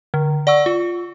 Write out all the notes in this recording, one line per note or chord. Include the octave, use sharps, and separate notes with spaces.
D3
D5 F#5 C#6 E6
F4